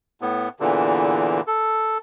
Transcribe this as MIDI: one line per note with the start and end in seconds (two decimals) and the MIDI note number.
0.22 0.49 45
0.22 0.49 59
0.60 1.41 40
0.60 1.41 46
0.60 1.41 50
0.60 1.41 52
1.47 1.98 69